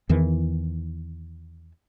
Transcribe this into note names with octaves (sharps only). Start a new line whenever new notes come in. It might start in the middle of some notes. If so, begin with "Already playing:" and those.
E2 D#3 E3